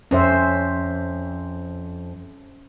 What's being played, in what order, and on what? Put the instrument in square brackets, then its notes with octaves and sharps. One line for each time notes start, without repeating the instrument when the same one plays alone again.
[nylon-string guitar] F2 [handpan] C#4 C5 E5